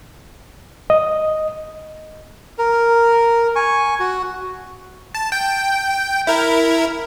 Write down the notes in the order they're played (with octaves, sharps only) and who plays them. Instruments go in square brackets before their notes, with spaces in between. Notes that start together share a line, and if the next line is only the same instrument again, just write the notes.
[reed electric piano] D#5
[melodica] A#4
G#5 C#6
F#4
[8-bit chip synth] A5
G5
E4 A#4